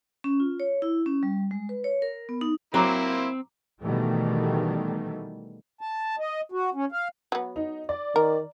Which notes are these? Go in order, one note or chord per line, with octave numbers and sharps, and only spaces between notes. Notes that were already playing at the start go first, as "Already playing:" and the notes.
C#4
F4
C#5
E4
C#4
G3
G#3
B4
C#5
A#4
B3
D#4
F#3 A#3 C4 E4 C5 A#5 D6
B2 D#3 E3 G3 A3
A5
D#5
F#4
C#4
F5
F#3 B3
D#4
D5
D#3 A#4